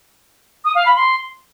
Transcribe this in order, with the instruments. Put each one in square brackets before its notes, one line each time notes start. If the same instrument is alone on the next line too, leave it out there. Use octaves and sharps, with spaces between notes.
[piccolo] D#6
F5
B5
C6